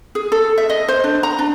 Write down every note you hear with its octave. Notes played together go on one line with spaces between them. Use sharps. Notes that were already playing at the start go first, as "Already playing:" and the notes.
G#4
A4
E5
D#5
C5
D4
A#5
D4